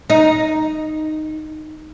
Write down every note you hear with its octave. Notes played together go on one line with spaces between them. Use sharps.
D#4